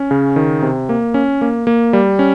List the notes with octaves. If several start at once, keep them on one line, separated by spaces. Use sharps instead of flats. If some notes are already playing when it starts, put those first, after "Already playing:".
Already playing: C#4
C#3
D#3
C3
A#3
C#4
A#3
A#3
G3
C#4